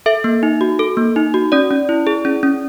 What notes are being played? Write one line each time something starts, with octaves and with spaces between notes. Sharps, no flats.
A4 E5
A#3
D#4
F#4
A4
A#3
D#4
F#4
C#4 D5
C#4
E4
G#4
C#4
C#4